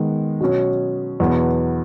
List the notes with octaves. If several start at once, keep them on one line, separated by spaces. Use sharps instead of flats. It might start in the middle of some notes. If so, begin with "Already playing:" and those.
Already playing: D#3 G#3 B3
B2 F#3 C#4
E2 B2 F#3 B3